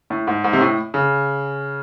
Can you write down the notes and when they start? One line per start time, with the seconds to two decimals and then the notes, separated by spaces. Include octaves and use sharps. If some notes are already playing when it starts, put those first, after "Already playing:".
0.10 A2
0.27 G#2
0.44 G#2
0.53 C3
0.61 A2
0.94 C#3